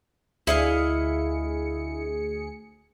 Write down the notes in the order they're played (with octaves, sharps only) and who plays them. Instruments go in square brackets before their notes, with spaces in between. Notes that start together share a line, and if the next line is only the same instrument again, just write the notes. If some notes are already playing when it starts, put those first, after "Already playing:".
[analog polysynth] D2 G#4 C#7 [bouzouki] E4 D#5 F5